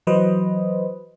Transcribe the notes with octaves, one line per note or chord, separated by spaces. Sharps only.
E3 F#3 B4 C5 D#5